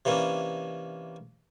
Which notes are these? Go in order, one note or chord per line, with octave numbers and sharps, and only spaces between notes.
C3 E3 A#3 C#4 D4